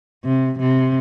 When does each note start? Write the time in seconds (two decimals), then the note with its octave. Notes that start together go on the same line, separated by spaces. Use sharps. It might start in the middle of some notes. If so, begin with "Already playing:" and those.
0.24 C3
0.59 C3